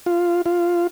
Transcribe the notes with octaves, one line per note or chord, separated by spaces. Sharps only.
F4
F4